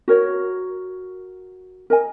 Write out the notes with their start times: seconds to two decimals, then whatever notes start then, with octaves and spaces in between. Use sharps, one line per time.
0.08 F#4 A#4 C#5
1.90 A#4 D#5 G#5